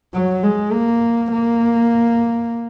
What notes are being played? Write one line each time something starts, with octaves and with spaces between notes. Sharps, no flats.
F#3
G#3
A#3
A#3